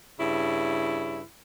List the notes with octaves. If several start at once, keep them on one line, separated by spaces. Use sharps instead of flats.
G2 C#3 E4